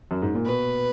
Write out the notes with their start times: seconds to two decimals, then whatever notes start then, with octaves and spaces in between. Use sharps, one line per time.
0.11 F#2
0.22 G#2
0.34 A#2
0.45 B2 B4